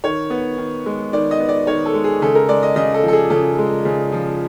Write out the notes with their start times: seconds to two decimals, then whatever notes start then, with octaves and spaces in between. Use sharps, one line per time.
0.04 D#3 C#5
0.30 B3
0.58 D#3
0.86 G#3
1.13 D#3 D5
1.31 D#5
1.40 B3
1.49 D5
1.67 D#3 C#5
1.86 A4
1.94 G#3
2.04 G#4
2.22 C#3 A4
2.35 A#4
2.49 G#3 D5
2.63 D#5
2.76 C#3 D#5
2.94 A4
3.03 F3
3.08 A4
3.13 G#4
3.30 C#3 A4
3.58 G#3
3.85 C#3
4.12 F3